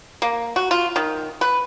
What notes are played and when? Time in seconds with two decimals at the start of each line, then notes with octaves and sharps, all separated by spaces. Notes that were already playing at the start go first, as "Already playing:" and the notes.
0.22 A#3
0.56 F#4
0.71 F4
0.96 D#3
1.41 B4